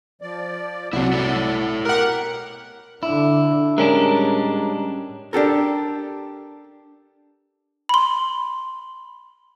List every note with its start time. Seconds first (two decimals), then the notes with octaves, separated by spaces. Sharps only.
0.22 F3 D5
0.93 C2 F#3 C4 E4 D5 F#5
1.13 E4 A4 C#5
1.85 B2 G4 A#4 F#5 F#6
3.03 D3 D4 E4
3.78 A2 G3 G#3 C#4 D4 A#4
5.33 D4 G4 A4 A#4
7.89 B5 C6